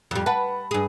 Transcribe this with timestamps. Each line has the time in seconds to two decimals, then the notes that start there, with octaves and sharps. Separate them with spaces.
0.11 F2 G3
0.26 B4 F#5 A5 B5
0.71 G2 G#4